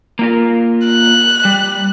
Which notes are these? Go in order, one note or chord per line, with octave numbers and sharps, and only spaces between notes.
A#3 F4 A#4
F#6
G3